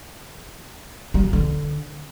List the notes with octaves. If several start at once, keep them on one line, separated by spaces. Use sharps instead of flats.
G3
F3
D3